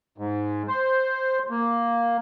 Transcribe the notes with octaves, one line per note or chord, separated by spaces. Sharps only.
G#2
C5
A#3